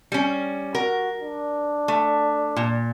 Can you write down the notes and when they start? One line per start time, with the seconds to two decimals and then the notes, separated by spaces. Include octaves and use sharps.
0.12 G3 C#4
0.75 F#4 A#4
1.22 D4
1.88 A3
2.56 A#2